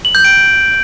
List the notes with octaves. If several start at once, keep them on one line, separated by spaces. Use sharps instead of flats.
F#7
G6
D7